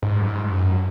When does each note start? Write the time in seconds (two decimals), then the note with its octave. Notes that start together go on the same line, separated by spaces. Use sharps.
0.02 G#2
0.21 F#2
0.27 G#2
0.44 G#2
0.51 F#2